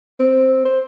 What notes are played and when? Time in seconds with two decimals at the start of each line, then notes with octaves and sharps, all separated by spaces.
0.20 C4
0.65 C5